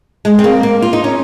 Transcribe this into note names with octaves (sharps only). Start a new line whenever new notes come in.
G#3
C4
A#3
A#3
F4
D#4
C#4